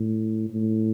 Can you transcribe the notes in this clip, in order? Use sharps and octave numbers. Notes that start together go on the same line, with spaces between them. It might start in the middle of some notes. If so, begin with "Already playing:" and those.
Already playing: A2
A2